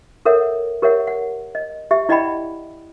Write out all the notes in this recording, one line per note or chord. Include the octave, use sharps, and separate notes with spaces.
A4 A#4 C#5 E5 F#5
G4 A#4 C#5 E5 F#5
F#5
D#5
G4 E5
E4 D5 D#5 F#5 G5 B5